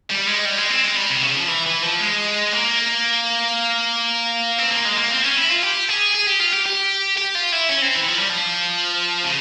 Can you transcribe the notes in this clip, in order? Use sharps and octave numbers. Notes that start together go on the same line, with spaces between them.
G3
G#3
G3
G#3
C4
G#3
G3
C3
C#3
F3
E3
E3
F3
G#3
A#3
C4
A#3
G#3
A#3
C4
C#4
E4
F4
G4
G#4
G#4
G4
F4
G4
G4
G4
F4
E4
C#4
C4
E3
F3
G3
F3
C#3